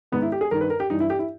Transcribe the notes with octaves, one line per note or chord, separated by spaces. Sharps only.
G#2 D#3 B3
E4
G4
G#4
G2 D#3 A#4
B4
A#4
G4
G2 E3 D#4
E4
G4
E4